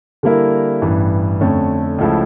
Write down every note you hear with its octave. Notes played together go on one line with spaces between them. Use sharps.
D3 G3 A#3 E4 A#4
A1 G2 E3
F2 D3 A3 C#4
C#2 C#3 F3 A3 E4